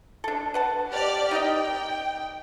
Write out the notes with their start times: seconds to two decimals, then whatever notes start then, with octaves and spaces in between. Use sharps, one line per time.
0.24 D4 A4
0.54 B4 F#5 A5
0.90 G4 D5 F6
1.31 D#4 D5 D#5 G5